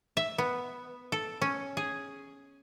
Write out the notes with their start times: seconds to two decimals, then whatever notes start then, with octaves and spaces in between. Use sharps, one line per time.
0.17 E5
0.38 B3
1.12 A4
1.41 C#4
1.77 G#4